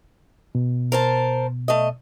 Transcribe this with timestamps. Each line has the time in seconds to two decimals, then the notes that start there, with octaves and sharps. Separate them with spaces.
0.55 B2
0.92 A#4 C5 A5
1.68 A3 D#5